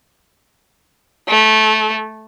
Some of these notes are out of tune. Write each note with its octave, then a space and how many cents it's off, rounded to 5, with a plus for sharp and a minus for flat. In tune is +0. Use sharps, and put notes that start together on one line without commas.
A3 -15